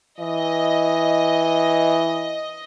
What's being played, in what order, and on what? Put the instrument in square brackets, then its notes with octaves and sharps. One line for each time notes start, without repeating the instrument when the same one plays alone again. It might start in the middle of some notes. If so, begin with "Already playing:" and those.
[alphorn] E3 [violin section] D#5